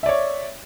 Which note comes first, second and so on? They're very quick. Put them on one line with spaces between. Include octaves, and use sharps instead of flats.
E5 D5 C#5